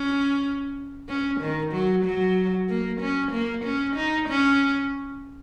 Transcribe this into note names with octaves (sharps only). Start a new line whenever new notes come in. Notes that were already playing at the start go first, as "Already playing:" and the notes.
Already playing: C#4
C#4
D#3
F#3
F#3
A#3
C#4
A#3
C#4
D#4
C#4